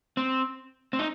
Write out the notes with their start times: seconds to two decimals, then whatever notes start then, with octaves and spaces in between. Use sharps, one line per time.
0.17 C4
0.93 C4
0.99 D#4